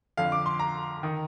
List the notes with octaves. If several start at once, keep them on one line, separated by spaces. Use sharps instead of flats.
F2 D3 F5
D6
C6
A#5
D#3